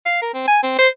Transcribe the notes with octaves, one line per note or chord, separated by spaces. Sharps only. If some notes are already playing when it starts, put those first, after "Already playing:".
F5
A#4
C4
G#5
C4
C5